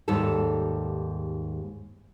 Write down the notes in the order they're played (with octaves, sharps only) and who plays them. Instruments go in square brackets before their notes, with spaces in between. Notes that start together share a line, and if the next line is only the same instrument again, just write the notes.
[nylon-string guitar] D#2 G#2 G3 D#4 A4 A5